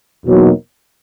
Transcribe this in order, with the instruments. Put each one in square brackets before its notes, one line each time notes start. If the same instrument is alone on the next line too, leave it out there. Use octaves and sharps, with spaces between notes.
[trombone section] E2 B2 F#3 A#3 D#4